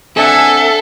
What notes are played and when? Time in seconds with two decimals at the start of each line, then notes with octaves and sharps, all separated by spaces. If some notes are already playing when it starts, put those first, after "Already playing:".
0.17 C4 D4 A4 E5 F#5 G#5